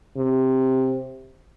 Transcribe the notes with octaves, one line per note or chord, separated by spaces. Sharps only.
C3